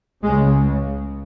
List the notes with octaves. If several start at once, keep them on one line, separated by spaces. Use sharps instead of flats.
C#2 C#3 G#3